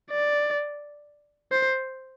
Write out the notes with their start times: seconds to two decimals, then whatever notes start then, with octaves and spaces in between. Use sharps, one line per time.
0.10 D5
1.52 C5